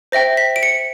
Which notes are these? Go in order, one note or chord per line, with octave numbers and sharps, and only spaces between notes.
C5 E5 G5 A#6
B6
D7
C#7